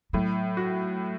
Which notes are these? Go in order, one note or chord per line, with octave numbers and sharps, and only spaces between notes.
A2 F#3
F#4